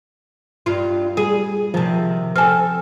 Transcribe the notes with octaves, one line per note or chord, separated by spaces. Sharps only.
G2 F4
G3 G#4
C3 D#3 F3 A5
C4 A4 G#5 F6